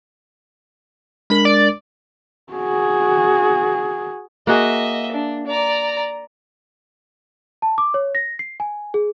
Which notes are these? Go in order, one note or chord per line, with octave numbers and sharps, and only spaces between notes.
G#3 D4 A#4 B5
D5
F#4 G#4
A#3 F#4 G#4 D#5 E5
D4
D5 A#5
A5
D6
C#5
A#6
C7
G#5
G#4